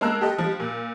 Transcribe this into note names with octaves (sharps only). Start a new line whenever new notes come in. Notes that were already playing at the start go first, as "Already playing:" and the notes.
G#3 A#3 A5 A#5 E6 F#6
G4 A4 D#5
F3 G3
A#2